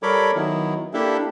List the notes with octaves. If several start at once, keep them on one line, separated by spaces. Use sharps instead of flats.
G3 A4 A#4 C#5 B5 D6
D#3 F#3 B3 E4
A#3 D4 E4 G4 A4 E5